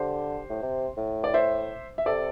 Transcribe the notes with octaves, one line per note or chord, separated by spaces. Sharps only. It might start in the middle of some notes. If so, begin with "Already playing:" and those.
Already playing: D3 G4 C5
A2
C3
A2
D5
C5 E5
E5
C3 A4 D5